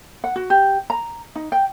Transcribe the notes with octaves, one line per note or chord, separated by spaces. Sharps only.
F#5
F#4
G4
A#5
D#4
G5